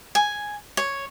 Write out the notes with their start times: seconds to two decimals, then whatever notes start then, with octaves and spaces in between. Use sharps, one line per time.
0.15 G#5
0.77 C#5